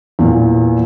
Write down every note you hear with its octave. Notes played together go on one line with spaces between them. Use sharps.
E2 A#2